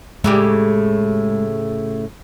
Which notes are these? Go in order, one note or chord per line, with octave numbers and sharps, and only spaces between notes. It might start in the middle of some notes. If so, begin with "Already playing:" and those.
A2 C#3 G#3 G4